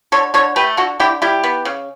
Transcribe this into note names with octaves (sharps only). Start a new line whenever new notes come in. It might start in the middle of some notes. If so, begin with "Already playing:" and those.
D3 A4 C#5
D3 A4 C#5
A3 G4 B4
D3 F#4 A4
D3 E4 G4
G3 E4 G4
B3
C#3